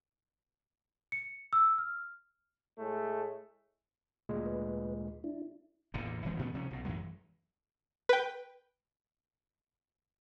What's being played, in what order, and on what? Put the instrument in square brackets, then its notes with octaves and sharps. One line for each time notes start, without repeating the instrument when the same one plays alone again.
[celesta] C#7
E6
F6
[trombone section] A2 G#3 A3
[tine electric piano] D2 A#2 G#3
[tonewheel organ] B4
D4 E4
[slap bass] A1 E2 A#2 D3
D#1 E3 G#3 C4
A#2 A3 B3 C#4
C3 F3 A#3 C#4
B1 B2
F#2 E3 F#3 G#3
[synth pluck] B4 G5